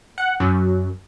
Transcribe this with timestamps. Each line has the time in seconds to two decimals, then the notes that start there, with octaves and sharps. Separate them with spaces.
0.18 F#5
0.40 F#2